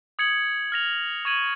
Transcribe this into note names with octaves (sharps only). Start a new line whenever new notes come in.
D#6 G#6 C#7 F#7
F6 A#6 F7
C#6 G#6 D#7 F#7